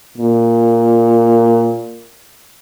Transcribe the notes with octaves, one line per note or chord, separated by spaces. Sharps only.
A#2